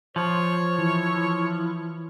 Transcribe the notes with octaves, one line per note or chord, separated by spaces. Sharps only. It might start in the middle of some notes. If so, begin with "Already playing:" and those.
F3 C5 C#5
E3 E4